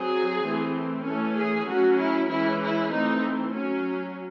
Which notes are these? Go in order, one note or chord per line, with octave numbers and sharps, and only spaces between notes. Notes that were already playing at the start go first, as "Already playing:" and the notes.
Already playing: F#3 C4 G#4
E3 A3 C4
E3 A3 C#4 A4
G#4
F#3 A3 C#4 F#4
E4
E3 G#3 C#4 E4
E4
E3 A3 C4 D#4
F#3 C#4